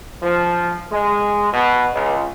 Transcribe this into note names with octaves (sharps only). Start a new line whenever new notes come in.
F3
G#3
B2
C#2